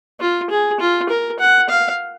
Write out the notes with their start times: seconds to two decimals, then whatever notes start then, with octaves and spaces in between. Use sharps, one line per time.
0.21 F4
0.50 G#4
0.80 F4
1.10 A#4
1.39 F#5
1.69 F5